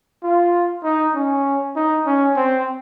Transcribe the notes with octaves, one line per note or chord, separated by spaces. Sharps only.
F4
D#4
C#4
D#4
C#4
C4